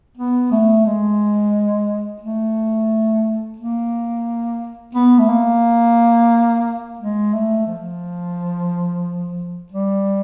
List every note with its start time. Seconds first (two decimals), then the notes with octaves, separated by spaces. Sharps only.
0.17 B3
0.52 A3
0.86 G#3
2.22 A3
3.58 A#3
4.95 B3
5.19 A3
5.29 A#3
7.00 G#3
7.34 A3
7.67 F3
9.72 G3